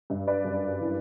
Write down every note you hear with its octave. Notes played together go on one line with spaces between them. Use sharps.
G2
B4 D5
F#2
E3